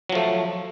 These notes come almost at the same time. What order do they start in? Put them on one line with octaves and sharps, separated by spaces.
F#3 F3 A3